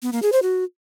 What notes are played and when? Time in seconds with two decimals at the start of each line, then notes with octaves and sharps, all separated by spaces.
0.03 B3
0.13 A#3
0.23 G#4
0.32 C5
0.42 F#4